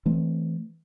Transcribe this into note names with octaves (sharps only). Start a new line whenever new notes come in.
E3 A3 C4